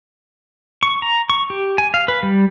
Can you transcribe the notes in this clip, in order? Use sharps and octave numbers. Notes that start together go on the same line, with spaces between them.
C#6
A#5
C#6
G4
G#5
F5
B4
G3